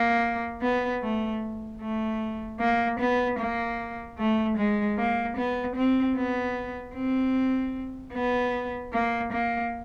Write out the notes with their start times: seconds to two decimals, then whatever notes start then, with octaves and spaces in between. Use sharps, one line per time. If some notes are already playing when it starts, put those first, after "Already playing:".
Already playing: A#3
0.61 B3
1.02 A3
1.81 A3
2.60 A#3
3.00 B3
3.39 A#3
4.18 A3
4.57 G#3
4.98 A#3
5.37 B3
5.76 C4
6.16 B3
6.95 C4
8.13 B3
8.93 A#3
9.33 A#3